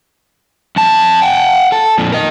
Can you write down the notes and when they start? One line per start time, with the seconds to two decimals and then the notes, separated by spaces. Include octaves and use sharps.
0.76 F2 A5
1.22 F#5 G5
1.72 A4
1.98 F2 A#2
2.12 A#4 D#5